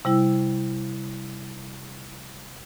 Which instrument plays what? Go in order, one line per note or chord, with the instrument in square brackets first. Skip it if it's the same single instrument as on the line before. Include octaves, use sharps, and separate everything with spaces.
[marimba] C3 G3 E4